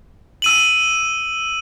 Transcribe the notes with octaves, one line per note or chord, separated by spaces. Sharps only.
E6 D#7 F#7